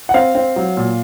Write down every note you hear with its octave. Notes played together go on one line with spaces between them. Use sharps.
F#5
C4 F5
C4
F#3
A#2